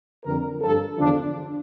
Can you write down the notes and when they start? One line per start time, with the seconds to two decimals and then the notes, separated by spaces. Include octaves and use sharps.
0.24 F2 D3 G3 A#4
0.61 G2 F3 A4
0.98 E2 D3 F3 D4